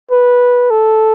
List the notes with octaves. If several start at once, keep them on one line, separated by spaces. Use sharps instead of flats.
B4
A4